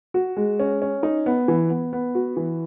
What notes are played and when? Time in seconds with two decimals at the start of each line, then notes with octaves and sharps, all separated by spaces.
0.14 F#4
0.37 G#3
0.60 C#4
0.82 C#4
1.03 D#4
1.26 B3
1.48 E3
1.70 B3
1.93 B3
2.15 F#4
2.37 E3